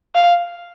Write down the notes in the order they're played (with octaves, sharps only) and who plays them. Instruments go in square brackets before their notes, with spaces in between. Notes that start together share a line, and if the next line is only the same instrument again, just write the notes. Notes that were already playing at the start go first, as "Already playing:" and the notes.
[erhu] F5